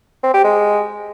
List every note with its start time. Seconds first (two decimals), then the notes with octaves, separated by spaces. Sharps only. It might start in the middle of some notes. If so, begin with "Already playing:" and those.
0.24 C4
0.34 G4
0.44 G#3